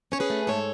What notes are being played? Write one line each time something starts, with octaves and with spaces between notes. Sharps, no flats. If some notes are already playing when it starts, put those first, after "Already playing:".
C#4 C#5
G#4 B4
A3
G#2 A4 C#5